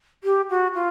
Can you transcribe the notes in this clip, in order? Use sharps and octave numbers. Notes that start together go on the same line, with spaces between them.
G4
F#4
F4